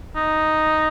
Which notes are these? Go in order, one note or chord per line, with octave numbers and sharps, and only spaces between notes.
D#4